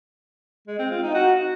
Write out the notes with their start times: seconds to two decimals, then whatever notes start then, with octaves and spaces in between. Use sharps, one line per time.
0.68 G#3
0.79 C4
0.91 F4
1.03 D#4
1.14 F#4